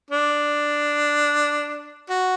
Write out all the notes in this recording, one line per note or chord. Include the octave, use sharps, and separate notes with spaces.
D4
F#4